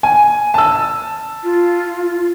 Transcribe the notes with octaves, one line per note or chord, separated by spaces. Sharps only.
G#5
A5 E6
F4